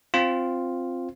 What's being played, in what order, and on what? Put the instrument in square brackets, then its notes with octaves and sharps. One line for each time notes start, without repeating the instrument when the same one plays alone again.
[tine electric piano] C4 F4